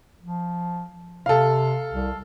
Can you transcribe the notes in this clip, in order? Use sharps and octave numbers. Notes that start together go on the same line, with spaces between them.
F3
C3 A4 F5
C2